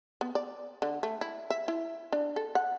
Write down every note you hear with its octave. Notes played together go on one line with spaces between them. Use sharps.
B3
D5
D3
A3
E4
E5
E4
D4
A4
F#5